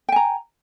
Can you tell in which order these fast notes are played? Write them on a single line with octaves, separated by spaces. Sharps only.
G5 G#5 A#5